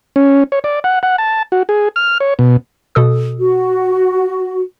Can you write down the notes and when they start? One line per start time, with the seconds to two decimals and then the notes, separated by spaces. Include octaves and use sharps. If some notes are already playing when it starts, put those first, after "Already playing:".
0.16 C#4
0.52 C#5
0.64 D5
0.84 F#5
1.03 F#5
1.18 A5
1.52 F#4
1.69 G#4
1.96 F6
2.20 C#5
2.39 B2
2.95 B2 A4 D#6
3.40 F#4